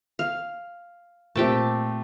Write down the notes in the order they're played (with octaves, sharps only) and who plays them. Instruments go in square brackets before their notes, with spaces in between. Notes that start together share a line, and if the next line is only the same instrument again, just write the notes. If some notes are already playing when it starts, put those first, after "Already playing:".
[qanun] F5
[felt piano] A#2 [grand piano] A3 C4 [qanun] G4 G5 A5